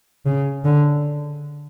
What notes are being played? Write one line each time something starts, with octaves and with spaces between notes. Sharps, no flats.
C#3
D3